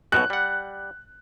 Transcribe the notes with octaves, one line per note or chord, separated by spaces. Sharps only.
B1 B2 F#4 F#6
G3 F#5